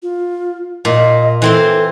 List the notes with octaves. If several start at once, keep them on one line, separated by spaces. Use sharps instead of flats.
F4
A#2 D#5
E3 C4 A4 C6